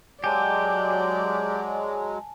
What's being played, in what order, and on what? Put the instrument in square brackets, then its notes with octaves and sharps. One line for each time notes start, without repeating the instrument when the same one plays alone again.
[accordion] F#3 G#3 [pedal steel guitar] G4 [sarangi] D5 [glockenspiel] G#5 A5